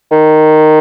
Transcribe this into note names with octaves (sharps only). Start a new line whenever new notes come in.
D#3